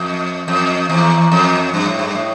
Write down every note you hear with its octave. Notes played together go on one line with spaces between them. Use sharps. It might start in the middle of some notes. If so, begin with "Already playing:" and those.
Already playing: F2
F2
E2
F2
G2
A2
G2
A2